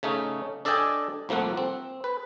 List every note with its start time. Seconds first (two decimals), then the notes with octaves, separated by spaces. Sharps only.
0.03 C#3 A3 C#4 D#4
0.65 D4 A4 D5 D#5 G5 G#5
1.29 C2 F3 A3 A#3 F#5
1.57 C4
2.04 B4